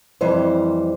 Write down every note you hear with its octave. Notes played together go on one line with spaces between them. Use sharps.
F2 E3 G3 C5